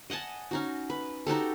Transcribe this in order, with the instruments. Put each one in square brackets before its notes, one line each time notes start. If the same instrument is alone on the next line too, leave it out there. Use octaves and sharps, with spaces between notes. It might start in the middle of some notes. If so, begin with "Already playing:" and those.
[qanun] D#5 F#5 G#5 A5
C#4 D#4 F#4
B4
D#4 F#4 G4 A4